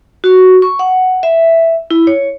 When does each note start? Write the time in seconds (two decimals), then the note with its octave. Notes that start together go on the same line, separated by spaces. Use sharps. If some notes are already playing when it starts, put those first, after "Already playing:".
0.24 F#4
0.62 C#6
0.79 F#5
1.23 E5
1.91 E4
2.07 C#5